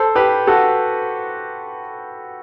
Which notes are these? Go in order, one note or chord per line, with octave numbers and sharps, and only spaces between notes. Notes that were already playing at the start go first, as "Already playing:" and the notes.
Already playing: A4 C5
G4 B4
F#4 A4